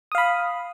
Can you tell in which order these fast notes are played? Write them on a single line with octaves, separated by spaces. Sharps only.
D#6 F5 B5